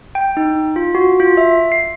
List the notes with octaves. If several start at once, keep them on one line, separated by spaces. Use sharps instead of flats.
G5
D#4
F4
F#4
F4
E5
C7